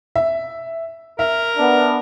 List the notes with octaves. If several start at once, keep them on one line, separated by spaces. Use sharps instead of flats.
E5
A#4 E5
B3 D4